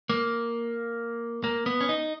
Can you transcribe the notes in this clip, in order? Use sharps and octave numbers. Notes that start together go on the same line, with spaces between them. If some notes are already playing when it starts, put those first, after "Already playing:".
A#3
A#3
B3
C#4
D#4